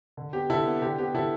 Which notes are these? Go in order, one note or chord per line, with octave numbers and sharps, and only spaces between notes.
D3
B3 G4
D3 E4 A4
B3
D3 G4
B3 G4
D3 E4 A4